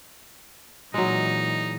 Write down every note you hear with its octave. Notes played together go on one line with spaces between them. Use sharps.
A#2 E3 F#3 G#3 D#4